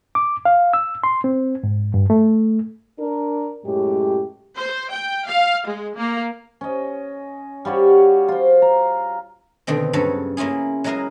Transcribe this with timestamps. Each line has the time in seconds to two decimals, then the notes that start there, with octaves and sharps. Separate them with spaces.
0.15 D6
0.45 F5
0.73 E6
1.04 C6
1.24 C4
1.63 G#2
1.94 G2
2.10 A3
2.99 D4 A#4
3.65 F#2 A2 G#3 G4
4.56 C5
4.90 G5
5.26 F5
5.66 G#3
5.97 A#3
6.61 C#4 D#5
7.65 G3 F4 F#4 C#5
8.28 F4 C5
8.62 A#5
9.67 B2 D3 D#3 C4
9.93 G2 C#3 F#3 A4 C#5
10.37 A#3 C#4 E4 F4 G#4
10.84 F#3 G#3 E4 A#4 D#5 F5